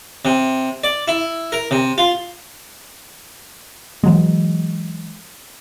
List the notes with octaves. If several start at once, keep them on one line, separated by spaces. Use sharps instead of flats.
C3
D5
E4
A#4
C3
F4
E3 F#3 G#3